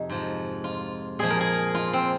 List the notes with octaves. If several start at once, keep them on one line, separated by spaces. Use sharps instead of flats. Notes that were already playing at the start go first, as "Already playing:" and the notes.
Already playing: F2 C3 D#4 G#4
G#2 F3
F4
A#2 F3 G#4
A#4
G#4
F4
C4